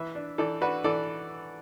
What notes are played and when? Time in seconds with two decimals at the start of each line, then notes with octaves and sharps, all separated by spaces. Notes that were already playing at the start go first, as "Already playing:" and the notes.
Already playing: E3 B4 E5
0.15 D4
0.38 E3 A4 D5
0.61 D4 F#4 B4
0.84 E3 A4 D5